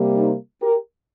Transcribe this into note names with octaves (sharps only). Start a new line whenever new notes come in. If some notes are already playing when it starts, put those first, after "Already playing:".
Already playing: C3 G3 A#3
C4 D#4
G4 A#4